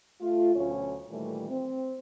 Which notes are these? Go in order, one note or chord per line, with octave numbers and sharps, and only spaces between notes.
A3 F4
D2 B2 F#3 C#4 C#5
A#2 D#3 E3 G3 A3
C4